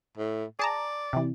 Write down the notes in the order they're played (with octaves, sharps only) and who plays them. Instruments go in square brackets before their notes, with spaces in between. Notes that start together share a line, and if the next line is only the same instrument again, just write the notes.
[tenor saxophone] A2
[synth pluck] G#4 A5 A#5 [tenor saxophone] D5
[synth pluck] C3 E3